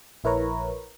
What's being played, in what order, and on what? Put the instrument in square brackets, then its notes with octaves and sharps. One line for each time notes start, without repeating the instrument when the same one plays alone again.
[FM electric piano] A#1 E4 A#4 B4 C#5 A#5